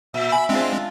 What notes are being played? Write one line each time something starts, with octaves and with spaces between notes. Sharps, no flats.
A#2 E5
G#5 B5
G#3 C4 D4 F4